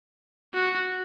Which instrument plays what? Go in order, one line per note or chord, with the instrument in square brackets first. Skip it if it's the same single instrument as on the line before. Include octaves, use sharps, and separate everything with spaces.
[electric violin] F#4